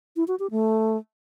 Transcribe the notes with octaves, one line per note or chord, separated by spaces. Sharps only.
E4
F#4
G4
A3